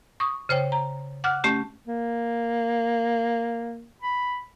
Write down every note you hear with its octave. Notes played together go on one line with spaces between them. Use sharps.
C#6 D#6
C#3 C5 C#5 G5
A#5
F#5 D6 F6 F#6
A3 C#4 G4
A#3
B5